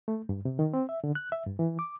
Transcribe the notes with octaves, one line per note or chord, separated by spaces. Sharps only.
A3
G2
C3
D#3
C4
E5
D3
F#6
E5
G2
E3
D6